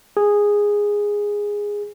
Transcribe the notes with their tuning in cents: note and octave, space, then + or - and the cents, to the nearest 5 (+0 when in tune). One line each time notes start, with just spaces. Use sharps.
G#4 -10